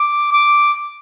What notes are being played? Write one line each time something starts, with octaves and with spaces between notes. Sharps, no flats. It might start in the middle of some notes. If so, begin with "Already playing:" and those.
Already playing: D6
D6